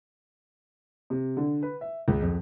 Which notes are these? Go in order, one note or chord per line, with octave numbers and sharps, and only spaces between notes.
C3
D3
B4
E5
C#2
F2